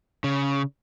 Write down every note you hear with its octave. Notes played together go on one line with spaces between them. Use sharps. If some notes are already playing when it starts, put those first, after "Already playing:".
C#3